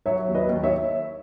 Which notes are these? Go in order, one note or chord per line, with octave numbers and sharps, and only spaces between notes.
F#3 C#5 E5
D#2
B4 D#5
D#2
C#5 E5